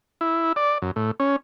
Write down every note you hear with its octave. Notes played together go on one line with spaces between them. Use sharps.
E4
D5
F#2
A2
C#4